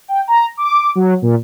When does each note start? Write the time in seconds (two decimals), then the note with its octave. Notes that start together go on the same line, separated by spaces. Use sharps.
0.08 G5
0.28 A#5
0.57 D6
0.95 F#3
1.22 A#2